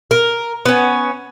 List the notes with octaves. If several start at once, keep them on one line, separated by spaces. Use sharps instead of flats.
A#4
B3 C#4